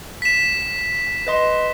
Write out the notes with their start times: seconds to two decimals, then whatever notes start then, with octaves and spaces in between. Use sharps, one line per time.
0.22 B6 E7
1.27 B4 D#5 C6